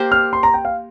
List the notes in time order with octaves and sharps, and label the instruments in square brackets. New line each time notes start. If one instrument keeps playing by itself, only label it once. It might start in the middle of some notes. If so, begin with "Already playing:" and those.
Already playing: [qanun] A#3 G4 C5
[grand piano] F6
C6
A#5
G5
F5